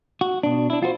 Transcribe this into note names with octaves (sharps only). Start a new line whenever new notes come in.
F#4
B2 D4
D4 E4
F4 F#4 B4 C5